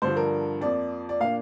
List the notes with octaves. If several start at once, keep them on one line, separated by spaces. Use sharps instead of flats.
G2 D3 F3 C5
A#4
F2 F3 A#3 D5
D5
A#2 A#3 D4 F5